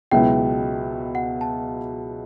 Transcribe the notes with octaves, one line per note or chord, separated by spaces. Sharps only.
C#2 B2 F#3 B3 E4 G5
F#5
A5